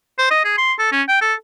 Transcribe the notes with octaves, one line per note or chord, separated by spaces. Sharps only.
C5
D#5
G#4
C6
A4
C#4
G5
A4